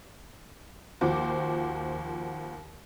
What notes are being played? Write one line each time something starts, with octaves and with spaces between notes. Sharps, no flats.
D#2 F3 F#4 C5 D6